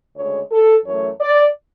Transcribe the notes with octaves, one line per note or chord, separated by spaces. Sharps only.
D2 C#3 G#3 C#5
A4
F#2 E3 A3 C#5
D5